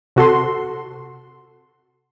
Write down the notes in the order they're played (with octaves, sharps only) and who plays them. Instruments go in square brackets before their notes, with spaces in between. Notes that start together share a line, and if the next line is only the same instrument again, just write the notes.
[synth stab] C3 F#4 A4 C6